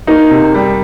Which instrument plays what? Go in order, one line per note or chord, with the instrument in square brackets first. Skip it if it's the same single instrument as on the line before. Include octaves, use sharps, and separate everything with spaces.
[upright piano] A#3 [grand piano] D#4
[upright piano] C3
G3